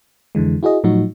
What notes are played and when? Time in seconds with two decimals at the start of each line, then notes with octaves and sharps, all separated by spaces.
0.35 F2 D3 E3 G#3
0.63 E4 F#4 G#4 D#5
0.84 A2 F3 F#3 D#4 F#4